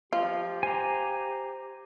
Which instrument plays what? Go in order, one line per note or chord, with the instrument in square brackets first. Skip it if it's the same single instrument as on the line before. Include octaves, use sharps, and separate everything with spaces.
[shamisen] F4 [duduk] G4 [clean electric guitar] C5 F5
[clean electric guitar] C5 [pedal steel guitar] G#5 A#5